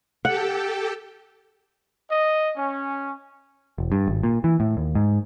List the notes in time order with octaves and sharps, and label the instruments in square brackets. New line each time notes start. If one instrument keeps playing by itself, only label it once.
[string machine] G4 A4 G5 [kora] F#5
[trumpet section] D#5
C#4
[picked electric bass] E1
G2
G#1
A#2
E3
A2
D#2
G#2